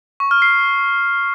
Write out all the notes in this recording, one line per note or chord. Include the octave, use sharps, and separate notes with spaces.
C#6
F6
C7